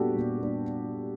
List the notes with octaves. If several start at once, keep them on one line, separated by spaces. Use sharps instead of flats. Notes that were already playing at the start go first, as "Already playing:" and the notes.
Already playing: A#2 G3 B3 D4 F#4 G4 A4
A#2
G3 B3 D4